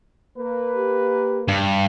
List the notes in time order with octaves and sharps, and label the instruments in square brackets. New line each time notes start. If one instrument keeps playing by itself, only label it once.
[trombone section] A#3 B4
[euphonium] G4
[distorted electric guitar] G2